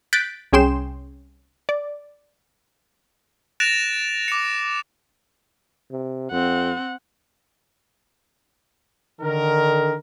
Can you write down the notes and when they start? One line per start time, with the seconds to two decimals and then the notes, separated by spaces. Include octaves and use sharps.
0.13 F#6 G6 A6 B6 D7
0.53 C2 C#4 G#4 G5 C6 E7
1.69 D5
3.60 F#6 A6 A#6 D7 E7 F7
4.28 D6 C#7
5.91 C3
6.31 F2 C4 F#5
9.21 D3 D#3 A#4